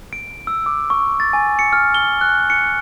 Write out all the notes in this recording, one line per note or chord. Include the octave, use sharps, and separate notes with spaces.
D7
E6
D6
C#6
A6
G#5
C#7
F6
G7
F#6
C#7